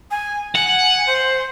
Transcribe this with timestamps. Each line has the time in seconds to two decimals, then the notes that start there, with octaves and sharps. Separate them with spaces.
0.11 G#5
0.56 F#5 G#5
1.07 C5